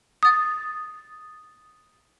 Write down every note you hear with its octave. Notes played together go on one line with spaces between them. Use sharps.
D#6 A6